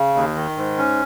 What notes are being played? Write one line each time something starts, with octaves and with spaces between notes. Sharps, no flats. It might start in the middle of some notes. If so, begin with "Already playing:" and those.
Already playing: C#3
D#2
D#3
G#2
C#4